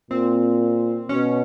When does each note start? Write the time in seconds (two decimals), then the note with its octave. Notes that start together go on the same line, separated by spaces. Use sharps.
0.11 A#2 C4
1.09 B2 C#4